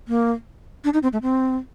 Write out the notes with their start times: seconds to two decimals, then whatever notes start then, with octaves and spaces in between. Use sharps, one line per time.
0.08 A#3
0.84 D4
0.94 D#4
1.03 C4
1.13 A3
1.22 C4